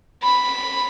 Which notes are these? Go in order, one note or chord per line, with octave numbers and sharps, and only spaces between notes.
B5